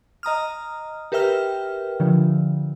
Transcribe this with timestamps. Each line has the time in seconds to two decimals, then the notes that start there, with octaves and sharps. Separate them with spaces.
0.23 D#5 A#5 D#6 F6
1.12 G4 A#4 B4 E5 G5 F6
2.00 D3 F3